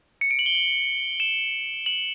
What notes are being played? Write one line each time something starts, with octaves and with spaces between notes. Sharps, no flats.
C#7
D7
F#7
G7
F#7
E7
F#7